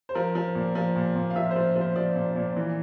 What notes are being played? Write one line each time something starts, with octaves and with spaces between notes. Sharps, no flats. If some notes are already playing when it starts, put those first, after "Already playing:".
C5
F3 A#4
F3
A#2
F3
A#2
A#2
F5
F3 E5
C5
F3
F3
C5
F3 D5
A#2
A#2
E3